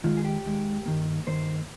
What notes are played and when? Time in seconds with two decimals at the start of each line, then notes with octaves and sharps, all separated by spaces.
0.04 D#2 D#3 G#3 F4
0.17 G#4
0.25 G4
0.45 D#2 D#3 G#3
0.86 G2 D#3 A#3
1.27 G2 D#3 A#3 C5